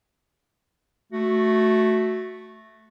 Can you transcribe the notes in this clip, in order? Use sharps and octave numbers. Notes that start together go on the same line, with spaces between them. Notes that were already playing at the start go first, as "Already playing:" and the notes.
A3 F#4